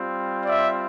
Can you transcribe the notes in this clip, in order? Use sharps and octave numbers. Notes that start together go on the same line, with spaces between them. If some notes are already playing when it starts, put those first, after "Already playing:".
Already playing: G3 C4 F4
D5 E5